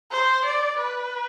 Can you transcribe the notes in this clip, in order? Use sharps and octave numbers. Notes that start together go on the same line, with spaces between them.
C5
D5
B4